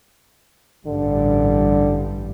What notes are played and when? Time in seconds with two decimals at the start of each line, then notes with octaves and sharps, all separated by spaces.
0.87 A1 G2 D3 G3